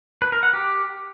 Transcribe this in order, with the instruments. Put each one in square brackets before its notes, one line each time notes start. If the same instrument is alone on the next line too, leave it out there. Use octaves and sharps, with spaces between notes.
[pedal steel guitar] B4
A#4
F#5
G4